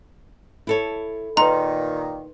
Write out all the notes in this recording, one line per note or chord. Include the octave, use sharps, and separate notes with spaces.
E4 A4 C#5
A#2 D#3 D#4 B4 A#5 C6